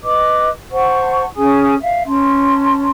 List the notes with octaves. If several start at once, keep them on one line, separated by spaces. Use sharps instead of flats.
B4 D#5 D6
C5 F#5 A5 C#6
C#4 G#4 G#5 D#6
E5 F5
C#4 A5 C6